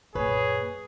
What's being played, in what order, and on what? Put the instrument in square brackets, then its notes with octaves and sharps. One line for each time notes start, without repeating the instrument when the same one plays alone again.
[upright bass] F#2 A#2 [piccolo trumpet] G#4 [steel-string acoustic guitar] B4 [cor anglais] C#5